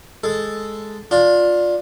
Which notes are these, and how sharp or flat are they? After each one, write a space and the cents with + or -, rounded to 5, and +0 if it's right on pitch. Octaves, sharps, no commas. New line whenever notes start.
G#3 +0 A4 +0
D4 +0 F4 +15